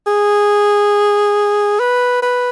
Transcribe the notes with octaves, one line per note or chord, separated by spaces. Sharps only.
G#4
B4
B4